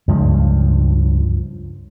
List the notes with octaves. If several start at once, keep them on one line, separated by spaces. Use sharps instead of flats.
C#2 G2 F3